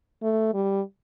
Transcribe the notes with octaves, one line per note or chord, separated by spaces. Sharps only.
A3
G3